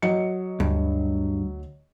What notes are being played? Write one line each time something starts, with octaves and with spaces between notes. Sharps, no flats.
F#3 D#5 C#7
D2 G2